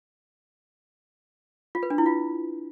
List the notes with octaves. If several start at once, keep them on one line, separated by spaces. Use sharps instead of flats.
F4
B4
D4
E4
F4